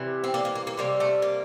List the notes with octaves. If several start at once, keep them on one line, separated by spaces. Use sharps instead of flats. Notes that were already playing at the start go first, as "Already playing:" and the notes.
Already playing: C3 E3 G3
C4
A#3 D4
A#3
A#3
A#3
C3 G3 A#3
A3
A#3